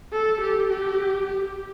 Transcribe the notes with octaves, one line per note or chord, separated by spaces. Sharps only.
A4
G4
G4
G4